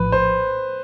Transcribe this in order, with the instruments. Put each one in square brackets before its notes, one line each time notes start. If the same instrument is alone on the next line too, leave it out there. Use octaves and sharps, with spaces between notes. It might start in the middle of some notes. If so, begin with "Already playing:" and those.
Already playing: [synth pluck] A#1 A2 F3 [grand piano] B4
[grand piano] C5